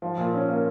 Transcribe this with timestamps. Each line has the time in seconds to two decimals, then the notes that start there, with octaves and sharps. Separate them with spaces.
0.02 F3
0.18 A#2
0.34 C#4
0.48 A#3